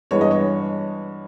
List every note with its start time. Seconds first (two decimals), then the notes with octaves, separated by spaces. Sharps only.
0.11 G2 E3 G#3 B3 C#5
0.21 D#5
0.31 C#5